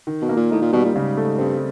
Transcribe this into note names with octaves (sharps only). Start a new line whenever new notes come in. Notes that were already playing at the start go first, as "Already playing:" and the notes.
D#3
B2
A#3
A#2
A2 D#4
A#2
B2 G3
A#2
G#2 C#3
A3
G2 C4